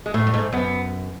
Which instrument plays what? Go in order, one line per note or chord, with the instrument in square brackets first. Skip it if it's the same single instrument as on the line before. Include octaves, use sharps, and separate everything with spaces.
[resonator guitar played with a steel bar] G#3
[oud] A2 [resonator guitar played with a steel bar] A3
[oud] G2
G#2
[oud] F#2 [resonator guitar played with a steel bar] B3